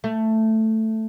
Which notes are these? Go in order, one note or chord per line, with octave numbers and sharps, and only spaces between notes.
A3